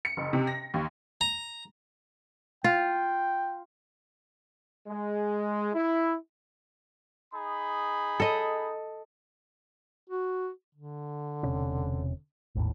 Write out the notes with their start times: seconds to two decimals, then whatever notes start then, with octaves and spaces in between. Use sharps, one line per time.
0.05 C#7
0.17 F#1
0.33 C3
0.47 A#6
0.74 D#2
1.21 A#5
2.64 F4 G5
4.87 G#3
5.74 E4
7.34 D#4 G#4 B5
8.20 A4 D#5
10.09 F#4
10.75 D3
11.43 E1 C3 C#4
12.55 G#1 D#2 A2